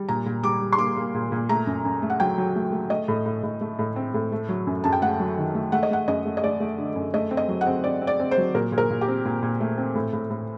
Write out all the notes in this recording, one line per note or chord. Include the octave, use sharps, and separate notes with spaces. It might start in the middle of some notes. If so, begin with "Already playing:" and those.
Already playing: G3
A#2 A#5
A#2
G3 D6
G3
C6
A#3 D6
A#3
A#2
A#2
A3 A#5
F#2
F#2
A3
F#5
F#3 G5
F#3
A3
A3
A3 D#5
A2
A2
A2
A3
A2
C4
A2
A3
F#3
F#2
F#2 A5
G5
A3 F#5
F#3
D#3
A3
A3 F#5
D#5
A3 F#5
F#2 D#5
A3
D#5
A3 D5
A3
D3
F#2
A3 D#5
C4
D#5
F#3
F#5
C4
C4 D5
C4
D5
C4
C5
F#3
A#2 A#4
A#2
A#4
A#2
G4
C4
A#2
A#2
A3
C4
A2
A2
A2